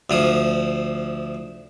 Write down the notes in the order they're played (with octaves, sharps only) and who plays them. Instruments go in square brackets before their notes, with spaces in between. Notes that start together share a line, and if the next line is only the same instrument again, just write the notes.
[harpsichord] D2 F3 D#6